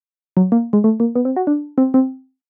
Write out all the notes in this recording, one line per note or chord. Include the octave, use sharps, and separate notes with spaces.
F#3
A#3
G#3
A3
A#3
B3
C4
F#4
D4
C4
C4